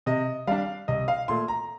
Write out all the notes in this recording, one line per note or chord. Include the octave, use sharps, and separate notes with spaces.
C3 D#5
G3 D4 F5
C2 D#5
F5
A#2 A3 C6
A#5